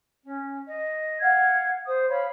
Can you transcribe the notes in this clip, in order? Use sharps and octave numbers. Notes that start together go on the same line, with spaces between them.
C#4
D#5
F5 F#5 G#6
C5 D#6
C#5 F5 B5